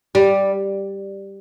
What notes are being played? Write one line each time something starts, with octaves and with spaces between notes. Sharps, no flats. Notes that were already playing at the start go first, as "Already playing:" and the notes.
G3